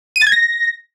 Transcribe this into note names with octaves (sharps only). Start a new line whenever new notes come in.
D#7
A6
G#6
A#6